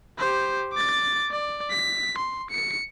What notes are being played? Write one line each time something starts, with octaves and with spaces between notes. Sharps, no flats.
G4 C5
D6 A6
D5
B6
C6
C#7